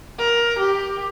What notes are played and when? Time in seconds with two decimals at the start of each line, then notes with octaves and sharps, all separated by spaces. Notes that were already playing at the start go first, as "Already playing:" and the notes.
0.19 A#4
0.59 G4